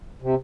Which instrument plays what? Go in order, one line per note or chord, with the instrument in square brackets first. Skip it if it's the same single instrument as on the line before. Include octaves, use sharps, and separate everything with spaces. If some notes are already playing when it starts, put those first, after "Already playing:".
[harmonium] C3